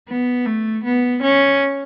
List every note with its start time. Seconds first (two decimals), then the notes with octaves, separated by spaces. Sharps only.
0.08 B3
0.46 A3
0.84 B3
1.23 C#4